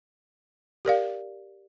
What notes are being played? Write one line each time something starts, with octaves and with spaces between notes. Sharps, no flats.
G4 A#4 D5 F5